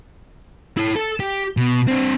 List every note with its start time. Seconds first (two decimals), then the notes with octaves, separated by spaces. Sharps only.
0.77 E4 C#5
0.96 A4
1.20 G4
1.57 B2
1.88 C4 D4